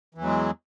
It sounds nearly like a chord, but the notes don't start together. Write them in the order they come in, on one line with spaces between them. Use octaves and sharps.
E3 E2 F#3 G#3